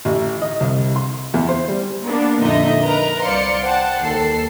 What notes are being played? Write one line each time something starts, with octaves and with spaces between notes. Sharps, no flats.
A1
D#5
C2
C6
E2
C5
G3
A#3 B3 D4
F2 A#2 D3 D#4 D#5 E5
A#4 B4 A#5
C2 C5 D5 F5 C6 C#7
C5 F#5 G5 A5
D#2 A4 C7